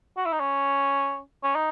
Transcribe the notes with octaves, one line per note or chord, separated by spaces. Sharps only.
F#4
E4
D#4
C#4
C#4
D#4